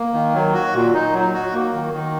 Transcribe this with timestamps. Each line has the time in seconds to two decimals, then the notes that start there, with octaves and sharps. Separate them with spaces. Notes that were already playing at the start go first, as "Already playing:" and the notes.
Already playing: A#3
0.14 D#3
0.35 F#3
0.54 F#4
0.74 A#2
0.94 D#4
1.13 F#3
1.34 F#4
1.53 A#3
1.73 D#3
1.93 D#3